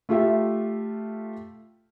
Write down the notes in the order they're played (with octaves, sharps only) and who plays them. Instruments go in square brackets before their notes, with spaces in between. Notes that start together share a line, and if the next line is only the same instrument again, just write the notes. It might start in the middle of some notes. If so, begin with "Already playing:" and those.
[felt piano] A3 F4 G4 E5